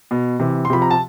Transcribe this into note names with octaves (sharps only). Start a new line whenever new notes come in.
B2
C3 E3
C6
C3 F3 B5
A#5
A5